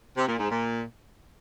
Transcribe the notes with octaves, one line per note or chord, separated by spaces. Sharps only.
C3
A#2
G#2
A#2